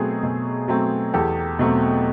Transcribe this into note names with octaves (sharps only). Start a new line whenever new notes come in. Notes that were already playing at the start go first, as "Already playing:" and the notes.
Already playing: B2 F#3 A3 C4 G#4
B2
F#3 A3 C4
E2 G4 A4
B2 F#3 A3 C4